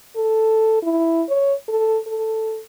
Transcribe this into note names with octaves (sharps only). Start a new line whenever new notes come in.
A4
E4
C#5
A4
A4